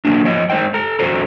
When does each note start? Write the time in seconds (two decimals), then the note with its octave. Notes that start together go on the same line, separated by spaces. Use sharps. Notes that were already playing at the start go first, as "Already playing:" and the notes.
0.05 F#3 A#3 D4
0.24 F3 C#5 D#5
0.50 G#3 D#4 C5 G5
0.74 A4 A#5
0.99 F2 F#4 A4 C5 A#5